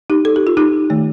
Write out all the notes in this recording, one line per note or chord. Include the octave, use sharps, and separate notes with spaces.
D#4 G4
A4
G4
F4
D#4 G4
D#3 A3